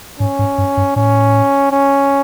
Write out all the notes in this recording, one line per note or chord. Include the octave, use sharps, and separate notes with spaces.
G#2 C#4
G#2
G2
G2
A2 C#4
C#4